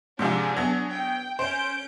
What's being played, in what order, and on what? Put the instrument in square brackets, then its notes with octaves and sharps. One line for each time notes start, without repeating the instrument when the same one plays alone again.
[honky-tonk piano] G#2 C3 F3 [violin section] D4 G#4
[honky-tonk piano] F#3 B3
[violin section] G5
[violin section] C#4 G6 D7 [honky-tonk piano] C5